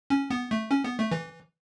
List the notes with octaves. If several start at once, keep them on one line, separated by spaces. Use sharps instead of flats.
C#4
B3
A3
C#4
B3
A3
E3